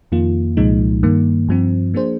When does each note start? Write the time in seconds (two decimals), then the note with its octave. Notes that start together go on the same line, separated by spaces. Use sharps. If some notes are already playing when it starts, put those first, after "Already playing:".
0.12 F2 D#3 A#3 F4
0.57 C2 A#2 F3 G#3 D#4
1.03 G2 D#3 A#3
1.48 G2 F3 C4
1.94 F3 A#3 D4 G#4 C5